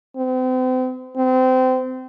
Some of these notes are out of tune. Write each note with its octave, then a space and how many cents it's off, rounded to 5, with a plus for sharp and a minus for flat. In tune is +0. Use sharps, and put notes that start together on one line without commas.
C4 -40
C4 -25